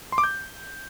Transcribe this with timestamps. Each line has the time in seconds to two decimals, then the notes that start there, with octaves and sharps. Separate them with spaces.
0.12 C6
0.18 D6
0.24 G6